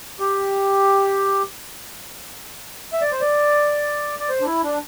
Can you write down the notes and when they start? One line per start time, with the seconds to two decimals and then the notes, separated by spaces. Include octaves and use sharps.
0.20 G4
2.93 E5
3.02 D5
3.12 C5
3.21 D5
4.19 D5
4.29 C5
4.41 D4
4.46 E4
4.63 D4